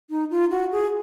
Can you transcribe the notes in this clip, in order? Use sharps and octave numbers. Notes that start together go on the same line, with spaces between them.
D#4
F4
F#4
G#4